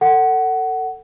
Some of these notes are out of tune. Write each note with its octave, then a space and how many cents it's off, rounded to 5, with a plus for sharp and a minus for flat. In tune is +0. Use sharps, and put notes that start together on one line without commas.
A4 +30 F#5 +15